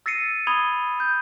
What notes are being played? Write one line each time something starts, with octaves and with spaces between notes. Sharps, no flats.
E6 A6 A#6 C7 C#7 D#7
B5 D#6 G#6 F7 G7
G6